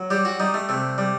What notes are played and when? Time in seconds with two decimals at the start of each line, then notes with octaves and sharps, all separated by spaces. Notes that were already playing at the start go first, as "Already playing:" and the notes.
Already playing: F#3
0.10 G3 G4
0.25 F#4
0.40 G3 D#4
0.54 A3
0.69 C3 A3
0.98 G3